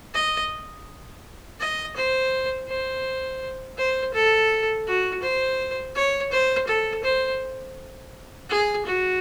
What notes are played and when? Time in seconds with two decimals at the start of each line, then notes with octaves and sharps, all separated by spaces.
0.14 D#5
1.60 D#5
1.96 C5
2.69 C5
3.78 C5
4.14 A4
4.87 F#4
5.23 C5
5.95 C#5
6.32 C5
6.68 A4
7.04 C5
8.49 G#4
8.85 F#4